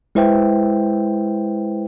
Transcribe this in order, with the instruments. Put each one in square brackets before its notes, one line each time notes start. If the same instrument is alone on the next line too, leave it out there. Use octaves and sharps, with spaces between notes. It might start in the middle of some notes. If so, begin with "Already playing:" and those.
[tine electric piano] G#3 E4 B4 C5 E5 G5